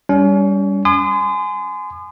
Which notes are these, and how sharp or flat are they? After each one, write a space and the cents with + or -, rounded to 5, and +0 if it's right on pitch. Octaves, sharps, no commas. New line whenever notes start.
G3 +10 C#4 +35
G#5 +15 C6 -35 D#6 -45